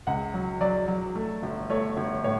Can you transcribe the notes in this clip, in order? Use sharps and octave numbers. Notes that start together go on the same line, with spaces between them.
C#2 F#5
F#3
F#3 D5
F#3
A3
G1
A3 C#5
G1
A2 C#5